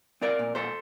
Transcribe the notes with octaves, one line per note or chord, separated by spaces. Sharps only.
C4 A#4 D5
A#2
A#2 A4 C5